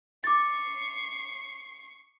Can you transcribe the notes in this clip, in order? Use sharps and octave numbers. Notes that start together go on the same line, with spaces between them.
C#6 D6 A6 C7